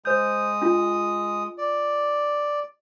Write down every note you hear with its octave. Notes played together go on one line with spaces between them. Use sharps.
G#3 C5 D#6 G6
D4 F4
D5